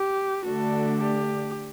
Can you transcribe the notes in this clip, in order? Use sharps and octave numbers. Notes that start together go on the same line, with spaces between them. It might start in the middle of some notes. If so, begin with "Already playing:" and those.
Already playing: G4
D3 A3 D4 F#4 A4
G4